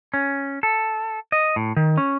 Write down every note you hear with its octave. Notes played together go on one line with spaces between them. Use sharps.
C#4
A4
D#5
A2
D#3
C#4